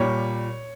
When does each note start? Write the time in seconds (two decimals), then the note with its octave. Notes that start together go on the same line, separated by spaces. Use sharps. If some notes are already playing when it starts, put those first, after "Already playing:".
Already playing: A#2 G3 C#5